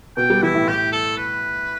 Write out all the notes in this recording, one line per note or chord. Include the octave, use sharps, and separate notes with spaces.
B2 G5
G3
E3 E4
A2
A2 G4
A4
B4